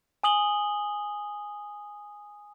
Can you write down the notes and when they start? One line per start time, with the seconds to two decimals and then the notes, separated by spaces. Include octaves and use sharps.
0.23 G#5 D#6 F#7 G7